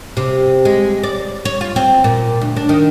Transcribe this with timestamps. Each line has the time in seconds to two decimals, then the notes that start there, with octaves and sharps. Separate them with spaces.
0.17 C3
0.65 G#3
1.03 D5
1.45 C#5
1.61 F4
1.76 C4
2.04 A#2
2.41 D2
2.56 D4
2.69 D#3